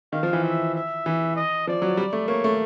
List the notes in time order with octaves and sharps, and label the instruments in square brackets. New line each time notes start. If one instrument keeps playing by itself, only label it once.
[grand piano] D#3 [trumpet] F5
[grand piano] F3
E3
[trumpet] E5
E5
[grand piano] E3
[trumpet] D#5
[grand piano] F3 [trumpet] D5
[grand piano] F#3
G3
A3
[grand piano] A#3 [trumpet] C#5
[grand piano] A3